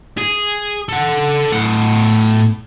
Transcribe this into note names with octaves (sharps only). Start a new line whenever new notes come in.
G#4
A4 F#5
A2 F#5